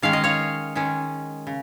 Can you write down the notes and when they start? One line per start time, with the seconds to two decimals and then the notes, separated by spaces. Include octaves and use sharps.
0.02 D#3 G#3 C#4 F5
0.13 D#5
0.24 C#5 F5
0.75 D#3 G#3 C#4
1.47 C#3